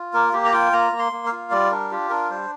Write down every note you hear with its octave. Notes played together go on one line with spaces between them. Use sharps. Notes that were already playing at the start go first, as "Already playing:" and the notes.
Already playing: F4
A#3 A#4
A#3 G4
A#5
F4 G5
A#3 A#5
A#3
C6
A#3
F5
F4
G3 D5
D4 A#4
F4 G4
D4 A#4
G3 C5